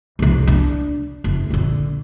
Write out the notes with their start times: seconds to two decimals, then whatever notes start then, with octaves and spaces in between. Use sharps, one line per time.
0.19 F#1 C2
0.47 D4
1.24 F#1
1.50 A#1 D3